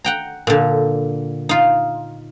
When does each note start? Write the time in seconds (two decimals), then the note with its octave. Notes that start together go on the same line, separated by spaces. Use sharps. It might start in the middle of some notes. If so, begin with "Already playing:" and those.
0.05 F#5 G5 A#5
0.47 A#2 D3
1.49 D#4 F4